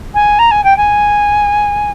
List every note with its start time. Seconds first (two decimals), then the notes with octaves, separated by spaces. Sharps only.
0.14 G#5
0.39 A#5
0.51 G#5
0.64 G5
0.77 G#5